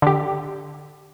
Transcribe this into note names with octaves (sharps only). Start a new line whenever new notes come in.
D3 G4